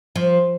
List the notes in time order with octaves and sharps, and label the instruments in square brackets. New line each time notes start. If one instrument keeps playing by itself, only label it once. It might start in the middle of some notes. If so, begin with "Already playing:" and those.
[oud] F3